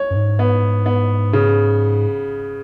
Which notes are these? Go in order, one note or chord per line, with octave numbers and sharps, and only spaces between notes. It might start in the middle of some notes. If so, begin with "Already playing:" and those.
Already playing: C#5
F#2
G#2
B3
B3
C#3